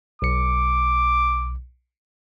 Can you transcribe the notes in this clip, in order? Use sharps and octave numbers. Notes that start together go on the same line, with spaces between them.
B1 D6 C#7